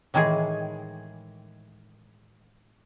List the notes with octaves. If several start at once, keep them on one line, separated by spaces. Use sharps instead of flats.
A2 D#3 E3 G#3 G#4